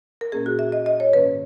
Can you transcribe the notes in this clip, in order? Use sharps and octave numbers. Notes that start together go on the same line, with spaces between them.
A#4
A#2 A#3 C#4 G#4
F#4
E5
D#5
D#5
C#5
G#2 D#3 A#3 C#4 B4